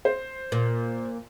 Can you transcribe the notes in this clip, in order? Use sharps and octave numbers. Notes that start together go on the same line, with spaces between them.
C5
A#2